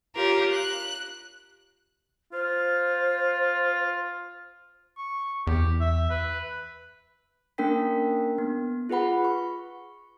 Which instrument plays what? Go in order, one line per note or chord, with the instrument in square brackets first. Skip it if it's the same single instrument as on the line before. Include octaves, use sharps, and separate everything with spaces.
[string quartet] F4 G4 A#4 C#5
F#6
[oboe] F4 [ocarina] C5
[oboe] C#6
[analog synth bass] E2 [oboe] G4
[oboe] E5
B4
[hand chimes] A#3 C#4 D4 A#4 G5 B6
B3
F4 G#4 B4 F#5 B5
C#6